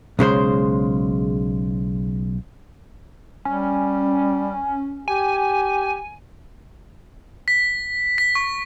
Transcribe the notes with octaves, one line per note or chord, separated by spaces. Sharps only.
B1 C#3 G#3 C5
G3 C#4
G4 G#5
B6
B6
C#6